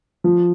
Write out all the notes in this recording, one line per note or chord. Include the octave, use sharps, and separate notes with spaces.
F3